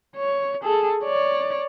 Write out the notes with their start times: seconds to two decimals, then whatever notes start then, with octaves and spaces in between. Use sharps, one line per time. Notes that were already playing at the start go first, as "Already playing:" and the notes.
0.16 C#5
0.63 G#4 A4
1.04 C#5 D5